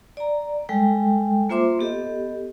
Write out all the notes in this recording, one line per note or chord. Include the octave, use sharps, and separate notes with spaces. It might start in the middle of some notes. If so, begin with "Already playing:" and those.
D5 A#5
G3 G#3 A4 G5
A#3 F4 C5 E5 C6 D6
B3 G4 A4 D#5